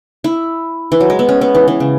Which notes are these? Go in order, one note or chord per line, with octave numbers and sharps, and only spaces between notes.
E4
E3
F#3
G#3
B3
C#4
B3
E3
E3
C#3